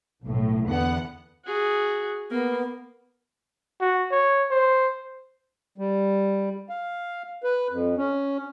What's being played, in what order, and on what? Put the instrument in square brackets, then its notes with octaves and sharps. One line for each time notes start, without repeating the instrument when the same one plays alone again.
[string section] B1 A2
E2 D3 B3 F#5
[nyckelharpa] F#4 G#4
[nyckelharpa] A#3 [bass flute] B3
[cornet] F#4
C#5
C5
[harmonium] G3
F5
B4
F2
C#4